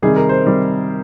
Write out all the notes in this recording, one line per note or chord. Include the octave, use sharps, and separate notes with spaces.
C3 D#3 G3 G#4
A#4
C5
C3 D#3 G3